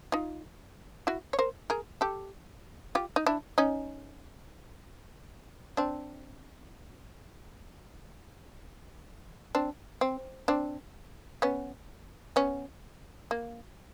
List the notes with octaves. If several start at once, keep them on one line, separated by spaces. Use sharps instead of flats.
D#4 F4
E4 F#4
C#5
A#4 C5
G#4 A#4
G4 A4
F4 G4
D#4
D4 E4
C#4 D#4
C4 D4
C4 D4
C4
C4 D4
B3 C#4
B3 C#4
A#3